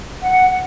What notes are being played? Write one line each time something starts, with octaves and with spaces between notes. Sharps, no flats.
F#5